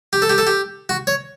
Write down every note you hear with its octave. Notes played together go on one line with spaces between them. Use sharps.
G4
A4
G4
A4
G4
F#4
C#5